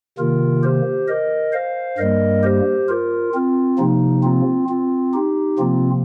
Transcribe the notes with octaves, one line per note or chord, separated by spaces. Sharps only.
C3 D#3 A#3 F4 A#4
G4 C5
A#4 D#5
C5 F5
G2 G3 A#3 A#4 D#5
G4 C5
F4 A#4
C4 F4
C3 F3 A#3 D#4
C4 F4
C4 F4
D#4 G4
C3 F3 A#3 C4 F4